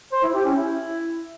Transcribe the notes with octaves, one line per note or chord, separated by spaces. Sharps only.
C5
E4
G4
C#4
E4